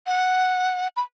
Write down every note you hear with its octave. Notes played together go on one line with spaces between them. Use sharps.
F#5
B5